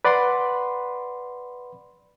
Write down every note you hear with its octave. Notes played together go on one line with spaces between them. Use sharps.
B4 D5 F#5 B5 C6